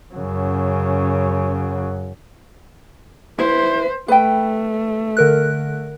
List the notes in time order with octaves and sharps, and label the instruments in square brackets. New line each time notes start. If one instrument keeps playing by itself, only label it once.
[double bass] F#2 C#3
[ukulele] E4 [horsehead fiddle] B4 C5
[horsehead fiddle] A3 [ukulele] B4 G5
[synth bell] D3 A#4 F#6